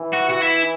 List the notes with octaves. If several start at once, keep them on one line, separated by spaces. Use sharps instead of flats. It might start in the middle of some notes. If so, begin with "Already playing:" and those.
Already playing: E3
F#4
F#4
E4